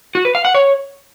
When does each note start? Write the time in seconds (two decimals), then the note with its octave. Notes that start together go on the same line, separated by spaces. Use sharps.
0.15 F#4
0.25 B4
0.35 F5
0.45 F#5
0.54 C#5